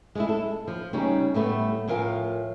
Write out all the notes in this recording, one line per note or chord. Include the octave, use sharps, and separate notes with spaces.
G#3 A3 E4
A4
F3
C#3 G3 C#4 D#4
A2 G3 A3 B3
A2 F3 A#4 F5 G#5